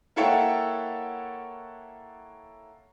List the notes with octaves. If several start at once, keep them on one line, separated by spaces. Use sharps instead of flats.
A#3 E4 A4 C#5 F#5 G5